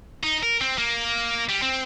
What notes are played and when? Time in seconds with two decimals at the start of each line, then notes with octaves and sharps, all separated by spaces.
0.23 D#4
0.43 A#4
0.61 C4
0.78 A#3
1.49 G3
1.62 C4